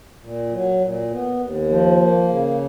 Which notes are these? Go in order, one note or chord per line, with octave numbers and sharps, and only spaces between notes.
A#2
F#3
A#2
B3
D#2
F3
A#3
C#3